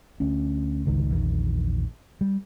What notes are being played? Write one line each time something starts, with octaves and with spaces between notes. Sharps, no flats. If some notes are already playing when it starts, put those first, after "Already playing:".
D2 C#4
G1 C#2 D#3
A#1 E2 D#3
G3